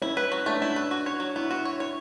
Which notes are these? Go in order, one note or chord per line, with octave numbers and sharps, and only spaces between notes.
C#4 E4
B4
F#3
A3 D4
E4
B4
F#4
C#5
F#3
B3 E4
F#4
C#5
C#5